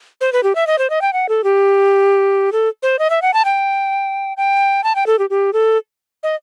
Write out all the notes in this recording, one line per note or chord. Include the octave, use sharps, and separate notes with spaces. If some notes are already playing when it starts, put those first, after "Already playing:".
C5
B4
G4
E5
D#5
C5
D#5
G5
F#5
A4
G4
A4
C5
D#5
E5
F#5
A5
G5
G5
A5
G5
A4
G4
G4
A4
D#5